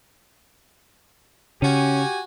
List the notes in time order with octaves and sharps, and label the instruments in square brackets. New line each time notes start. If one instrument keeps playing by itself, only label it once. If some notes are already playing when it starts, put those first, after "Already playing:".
[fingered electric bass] C#3 [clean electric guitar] C#4 [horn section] F#4 G4 G#5